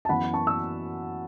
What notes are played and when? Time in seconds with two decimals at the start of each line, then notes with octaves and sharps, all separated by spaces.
0.05 A5
0.09 F#2 E3 B3 F#5 B5
0.33 A5 C#6
0.47 E6